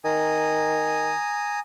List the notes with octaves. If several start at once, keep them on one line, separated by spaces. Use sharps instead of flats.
D#3 G#5 A#5 D#6